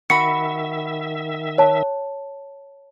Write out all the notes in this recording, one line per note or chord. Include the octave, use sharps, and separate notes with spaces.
D#3 F#4 E5 B5 C#7
C#5 A5